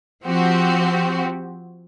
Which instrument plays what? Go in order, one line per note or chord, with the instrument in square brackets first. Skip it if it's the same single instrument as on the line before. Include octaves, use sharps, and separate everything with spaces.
[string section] F3 C4 F#4 G4